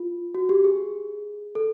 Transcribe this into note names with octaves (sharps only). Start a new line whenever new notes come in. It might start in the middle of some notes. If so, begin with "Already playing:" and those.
Already playing: F4
F#4
G4
G#4
A4